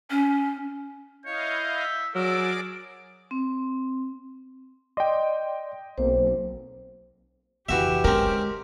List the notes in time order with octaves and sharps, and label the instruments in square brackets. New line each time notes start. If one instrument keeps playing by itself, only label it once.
[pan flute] C#4
[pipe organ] E4 D#5 F5 [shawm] C#5 [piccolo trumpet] G6
[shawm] E5
[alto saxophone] F#3 [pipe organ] G#4 D5 D6 [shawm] A#4 [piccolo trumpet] E6
[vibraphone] C4
[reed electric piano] D5 C6 [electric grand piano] D#5 G5
[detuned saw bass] B1 [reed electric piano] A#3 C4 [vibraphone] C5
[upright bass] F2 C#3 [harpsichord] E3 F#4 E5 [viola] G4
[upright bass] D3 G#3 [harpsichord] C4 C#4 [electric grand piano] A#4